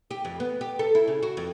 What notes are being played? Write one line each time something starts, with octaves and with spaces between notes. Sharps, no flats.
G4
F2
B3
G4
A4
E4
C#3
F#4
F2